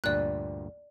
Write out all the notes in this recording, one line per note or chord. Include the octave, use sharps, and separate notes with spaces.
D2 G2 A#2 D5 F#6